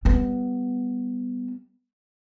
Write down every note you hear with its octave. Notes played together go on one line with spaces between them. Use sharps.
G3 B3